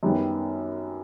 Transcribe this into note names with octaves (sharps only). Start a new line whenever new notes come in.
F#2 D#3 G3 B3